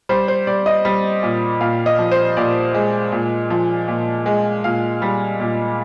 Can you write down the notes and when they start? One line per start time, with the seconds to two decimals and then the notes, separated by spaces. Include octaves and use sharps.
0.09 G3 C5
0.28 C5
0.47 G3 D5
0.66 D#5
0.85 G3
1.23 A#2
1.61 A#2 F5
1.86 D#5
1.99 F3
2.12 C5
2.37 A#2 D5
2.74 G#3
3.12 A#2
3.50 F3
3.88 A#2
4.26 G#3
4.64 A#2 F5
5.02 G3
5.40 A#2